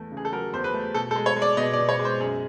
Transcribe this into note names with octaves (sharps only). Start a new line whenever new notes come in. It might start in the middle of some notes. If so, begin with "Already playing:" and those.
Already playing: E2 A3
C#3
G#4
A4
F#3 A#4
E2 C5
B4
A3
B2 A4
A4
G#3
C#5
G#3
D5
B2 D#5
D5
B2
C#5
G#3
C5
F#2 G#4